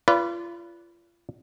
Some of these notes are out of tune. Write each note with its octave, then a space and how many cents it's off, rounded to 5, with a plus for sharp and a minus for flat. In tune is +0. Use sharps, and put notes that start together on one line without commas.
F4 -35 B4 +0 D5 -30